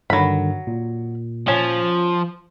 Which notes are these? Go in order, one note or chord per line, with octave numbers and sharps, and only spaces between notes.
G2 D3 D#3 F#3 B5
A#2
F3 C#4